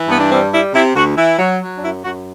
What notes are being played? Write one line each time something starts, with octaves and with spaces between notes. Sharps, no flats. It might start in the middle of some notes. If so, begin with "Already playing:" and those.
Already playing: E3
G2 B3
D4
G3 C4
G3 E4
C3 E4
D2 F#4
E3 E4
F#3
F#3
D4
F#2 E4
F#2 F#4